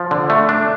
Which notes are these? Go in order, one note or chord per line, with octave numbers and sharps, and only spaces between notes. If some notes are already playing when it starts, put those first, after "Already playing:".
Already playing: F3
D3
A3
D4